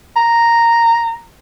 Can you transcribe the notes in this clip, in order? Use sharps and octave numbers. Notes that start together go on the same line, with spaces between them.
A#5